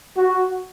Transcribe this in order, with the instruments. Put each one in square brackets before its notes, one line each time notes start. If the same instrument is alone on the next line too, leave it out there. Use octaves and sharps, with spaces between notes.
[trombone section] F#4